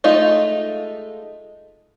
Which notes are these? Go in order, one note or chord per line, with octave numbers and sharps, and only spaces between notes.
G#3 A3 D#4 F4